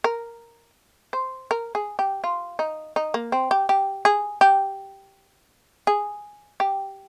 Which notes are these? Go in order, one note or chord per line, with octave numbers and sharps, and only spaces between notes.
A#4
C5
A#4
G#4
G4
F4
D#4
D#4
A#3
C4
G4
G4
G#4
G4
G#4
G4